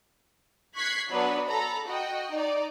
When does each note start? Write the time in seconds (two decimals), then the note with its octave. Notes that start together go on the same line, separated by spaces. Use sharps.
0.75 C#6 F#6 G#6 B6 C7
1.10 F#3 B3 D4 B4
1.46 A4 A#5 B5
1.87 F#4 D#5 G5
2.31 D#4 D5